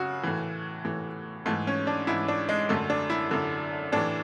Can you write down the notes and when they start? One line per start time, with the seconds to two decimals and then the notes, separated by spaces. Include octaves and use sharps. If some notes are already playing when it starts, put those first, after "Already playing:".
Already playing: F#2 C#3 F#4
0.23 A2 E3
0.85 A2 E3
1.46 G#2 E3 A3
1.67 C#4
1.87 D4
2.07 G#2 E3 E4
2.28 D4
2.49 G#3
2.69 F#2 D3 A3
2.90 D4
3.10 E4
3.31 F#2 D3
3.92 A2 E3 D4